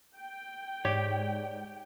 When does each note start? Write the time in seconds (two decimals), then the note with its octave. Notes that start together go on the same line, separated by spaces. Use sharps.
0.18 G5
0.85 G#2 G4 C#5 D5